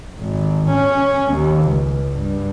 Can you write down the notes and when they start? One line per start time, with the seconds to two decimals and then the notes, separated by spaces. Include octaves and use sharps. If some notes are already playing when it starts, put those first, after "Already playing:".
0.20 G#1
0.70 C#4
1.32 D#2
1.64 C#2
2.12 G2